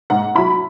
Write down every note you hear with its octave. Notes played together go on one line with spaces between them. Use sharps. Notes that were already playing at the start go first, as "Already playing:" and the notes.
G#2 F#5
F#3 E4 B5